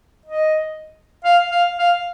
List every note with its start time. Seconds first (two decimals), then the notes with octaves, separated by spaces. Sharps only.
0.26 D#5
1.25 F5
1.51 F5
1.79 F5